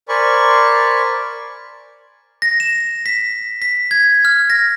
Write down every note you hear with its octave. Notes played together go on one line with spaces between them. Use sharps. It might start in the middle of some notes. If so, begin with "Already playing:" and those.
A#4 C5 D5 G#5 B5 C#6
A#6
E7
B6
B6
G#6
F6
A#6